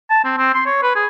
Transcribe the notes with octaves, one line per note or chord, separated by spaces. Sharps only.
A5
C4
C4
C6
C#5
B4
G#4